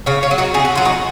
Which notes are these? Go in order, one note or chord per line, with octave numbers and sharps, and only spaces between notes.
C#3 C#5 F5
C#5 F5
F#3
D#4 F#4
C#3 G#4
F#4
F#3 F4
D#4 F#4